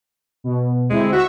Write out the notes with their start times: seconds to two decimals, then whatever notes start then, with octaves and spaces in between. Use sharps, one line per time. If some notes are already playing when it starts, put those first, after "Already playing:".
0.44 B2
0.90 D2 G#3 C4 E4
1.12 F#4 E5 C#6 E6